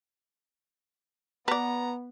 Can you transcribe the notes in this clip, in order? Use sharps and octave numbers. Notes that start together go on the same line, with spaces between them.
B3 B4 D5 A#5